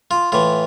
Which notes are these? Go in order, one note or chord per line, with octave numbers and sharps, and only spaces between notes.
F4
A2 E3 F4